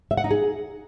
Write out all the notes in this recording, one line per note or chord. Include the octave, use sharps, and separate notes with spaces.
E5
F#5
D#4
G#4